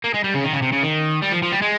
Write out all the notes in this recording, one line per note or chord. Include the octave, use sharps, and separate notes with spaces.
A#3
G#3
G3
C#3
D#3
C#3
C3
C#3
D#3
G3
F3
F3
G3
G#3